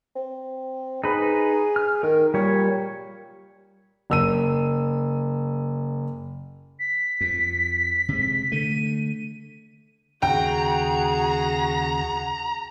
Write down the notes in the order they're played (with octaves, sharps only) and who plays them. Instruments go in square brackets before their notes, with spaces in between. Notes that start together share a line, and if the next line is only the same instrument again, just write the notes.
[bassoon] C4
[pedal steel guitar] D#4 B4 [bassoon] G#4
[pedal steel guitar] F6
[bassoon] D#3 [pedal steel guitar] A#4
[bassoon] A#2 [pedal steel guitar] G3 C#5
[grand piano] F#1 E6 D#7
[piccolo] B6
[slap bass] F2
C3 G#3
[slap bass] D3 A3 [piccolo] D#7
[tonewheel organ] D#2 C#3 [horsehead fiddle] F#4 G#4 [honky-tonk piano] G5 [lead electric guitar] A#5